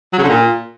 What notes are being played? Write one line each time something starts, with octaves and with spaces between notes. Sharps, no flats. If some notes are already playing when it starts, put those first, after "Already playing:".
F#3
C#3
D3
A#2